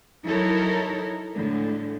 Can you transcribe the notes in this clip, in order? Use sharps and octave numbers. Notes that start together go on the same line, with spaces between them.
F#3 D#4 E4 A4 A#4 C#5
A2 D3 G#3